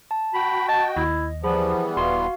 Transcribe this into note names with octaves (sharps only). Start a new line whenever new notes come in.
A5
F#4 G5 B5
D#5 A5
D#2 E4
E3 F3 G3 B3 G#4 B5
D#1 F#4 F5 C6